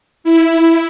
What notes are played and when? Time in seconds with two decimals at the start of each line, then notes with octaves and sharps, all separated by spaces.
0.24 E4